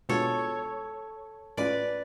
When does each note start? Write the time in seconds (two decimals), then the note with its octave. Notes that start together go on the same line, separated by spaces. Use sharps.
0.09 B2 G#3 D4 F4 A4 C#5
1.57 A2 G#3 C#4 F4 B4 D5